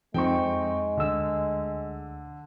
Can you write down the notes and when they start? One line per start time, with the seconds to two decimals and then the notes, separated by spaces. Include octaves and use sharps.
0.14 F2 G#3 C4 D#4 G5 C#6
0.97 D2 D3 E6